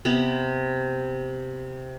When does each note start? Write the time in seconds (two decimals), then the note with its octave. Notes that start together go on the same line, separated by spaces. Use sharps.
0.05 C3 B3 B4 A#5